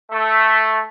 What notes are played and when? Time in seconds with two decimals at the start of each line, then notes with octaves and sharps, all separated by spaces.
0.11 A3